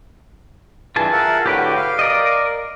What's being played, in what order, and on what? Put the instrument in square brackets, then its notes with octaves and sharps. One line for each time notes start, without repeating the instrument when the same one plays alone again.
[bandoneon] G2 E3 [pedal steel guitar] F4 G#4 A5
[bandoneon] A#4 E5 F#5
[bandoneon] A2 D3 F#4 [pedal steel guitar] G4 B4 G5
[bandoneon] F5
[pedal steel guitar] A#4 D5 D#5